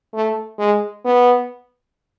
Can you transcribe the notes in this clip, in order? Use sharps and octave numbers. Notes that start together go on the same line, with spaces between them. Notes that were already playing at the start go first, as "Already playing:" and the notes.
A3
G#3
B3